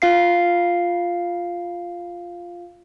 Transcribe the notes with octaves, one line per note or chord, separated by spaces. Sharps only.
F4 F5 C7